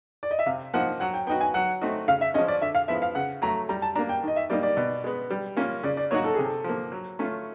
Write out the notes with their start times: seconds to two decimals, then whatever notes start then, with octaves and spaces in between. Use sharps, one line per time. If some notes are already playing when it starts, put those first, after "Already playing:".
0.23 D5
0.31 D#5
0.39 E5
0.46 C3 F5
0.74 F3 A#3 D#4 F#5
1.00 F#3 F#5
1.14 G5
1.27 B3 D#4 F#4 G5
1.41 G#5
1.54 F#3 F#5
1.81 A3 C4 D#4 F#4
2.08 C#3 F5
2.21 E5
2.34 F3 G#3 C#4 D#5
2.48 D5
2.62 D3 E5
2.75 F5
2.88 F3 G#3 B3 E4 E5
3.02 F5
3.15 C#3 F#5
3.42 F#3 A3 A#5
3.69 G3 A#5
3.82 A5
3.96 A#3 D4 A#5
4.09 G5
4.23 D#3 D#5
4.36 E5
4.50 G3 A#3 D#4 D5
4.63 D5
4.77 B2
5.04 G#3 B3
5.30 G3
5.57 A#3 C#4 F4
5.83 C#3 D5
5.97 D5
6.11 F#3 A#3 D#4 F#4 C#5
6.24 A4
6.34 C3 G#4
6.45 A4
6.64 F3 A#3
6.92 F#3
7.19 A3 C#4 F4